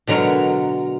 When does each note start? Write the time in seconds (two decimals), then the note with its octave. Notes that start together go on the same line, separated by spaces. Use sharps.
0.07 B2 D3 F#3 G#3 A#4